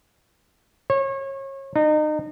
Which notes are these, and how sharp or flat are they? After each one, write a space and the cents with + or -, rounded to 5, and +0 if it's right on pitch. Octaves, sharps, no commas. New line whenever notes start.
C#5 -30
D#4 -30